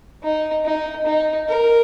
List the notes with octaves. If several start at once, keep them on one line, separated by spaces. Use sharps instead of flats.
D#4
D#4
D#4
A#4